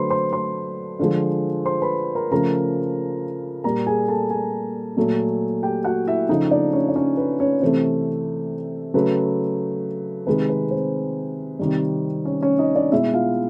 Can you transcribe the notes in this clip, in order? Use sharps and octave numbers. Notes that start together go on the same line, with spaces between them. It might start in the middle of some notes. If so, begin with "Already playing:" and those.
Already playing: D3 F#3 A3 B4 C5 B5 C6
C5 C6
C5 C6
D3 F3 G#3
C5 C6
B4 B5
A#4 A#5
C#3 F3 A3 A#4 A#5
A#2 G3 A#4 A#5
G#4 G#5
A4 A5
G#4 G#5
A#2 F#3 A3
G4 G5
F#4 F#5
E4 E5
C#3 F3 A3 D#4 D#5
D4 D5
C#4 C#5
D5
C#4 C#5
B4
C#4 C#5
C3 E3 A3 C4 C5
C#3 F#3 A3 B4
C3 D#3 G#3 B4
B4
C4 C5
C3 D#3 G3
C#4 C#5
C#4 C#5
D#4 D#5
D4 D5
B2 G#3 E4 E5
F4 F5